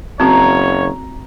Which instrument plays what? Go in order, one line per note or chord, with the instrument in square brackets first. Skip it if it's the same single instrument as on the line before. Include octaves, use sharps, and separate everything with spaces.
[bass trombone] F#1 [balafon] C4 F#4 [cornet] C#5 [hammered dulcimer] A#5